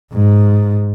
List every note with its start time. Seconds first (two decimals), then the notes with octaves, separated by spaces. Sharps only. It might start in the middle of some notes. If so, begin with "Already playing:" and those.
0.13 G#2